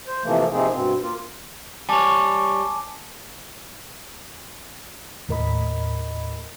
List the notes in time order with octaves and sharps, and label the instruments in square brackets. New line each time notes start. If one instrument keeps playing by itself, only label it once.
[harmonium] C5
C3 E3 F3 A3 A#3
C3 F3 A#3 C4 D#4 G#4
G2 B2 C4
A#3 F4
[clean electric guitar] G3 C#5 [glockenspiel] G#5 A5 D6
[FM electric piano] D#2 A2 A#4 D#5 B5